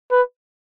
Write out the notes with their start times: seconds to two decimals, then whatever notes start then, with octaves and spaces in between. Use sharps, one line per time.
0.12 B4